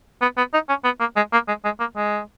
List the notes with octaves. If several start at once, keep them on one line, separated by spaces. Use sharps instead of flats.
B3
B3
D#4
C#4
B3
A#3
G#3
A#3
G#3
G#3
A#3
G#3